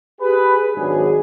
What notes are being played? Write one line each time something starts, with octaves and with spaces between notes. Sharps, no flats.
G4 G#4 B4
G#1 F#3 D4 G#4